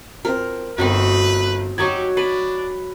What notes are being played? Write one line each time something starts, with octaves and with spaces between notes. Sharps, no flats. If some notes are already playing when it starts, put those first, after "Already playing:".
F3 C4 A#4
G1 C4 D#4 F#4 A#4 B4
F#3 D#4 F#4 G4 C#6 G#6
D4 B4